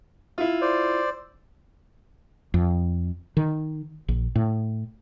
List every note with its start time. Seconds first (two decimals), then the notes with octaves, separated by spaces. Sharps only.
0.38 E4 F4
0.61 C5 D5
2.54 F2
3.37 D#3
4.08 A#1
4.35 A2